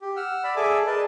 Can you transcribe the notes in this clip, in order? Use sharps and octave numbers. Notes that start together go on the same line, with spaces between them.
G4
F#5 E6 F6
D5 B5 E6
G#4 A4 D5 E5 G#5 D6
G#4 A#4 B4 D5 D#5 A5